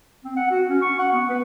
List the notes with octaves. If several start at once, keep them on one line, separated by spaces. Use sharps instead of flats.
C4
F#5
F#4
C#4
C#6
F#5
B3
B4